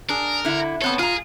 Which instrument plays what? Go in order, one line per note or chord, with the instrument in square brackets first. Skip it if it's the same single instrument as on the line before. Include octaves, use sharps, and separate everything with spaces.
[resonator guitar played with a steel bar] D4 G#4 [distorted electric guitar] A#4
[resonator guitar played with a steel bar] D3 E4
[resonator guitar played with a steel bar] B3 C4 C#5 [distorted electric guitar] A4
[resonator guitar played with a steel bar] F4 A#5 [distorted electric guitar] G#4